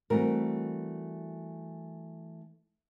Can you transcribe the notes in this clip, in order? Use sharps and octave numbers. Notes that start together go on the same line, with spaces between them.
E3 G3 A3 C4 F#4 A#4